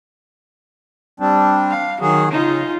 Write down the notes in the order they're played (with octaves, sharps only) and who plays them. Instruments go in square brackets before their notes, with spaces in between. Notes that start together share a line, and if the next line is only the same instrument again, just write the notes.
[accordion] G3 C4 D4
[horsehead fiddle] F5
[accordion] D#3 G#4 [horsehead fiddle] F#3
[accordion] C#3 [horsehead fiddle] D#4 F4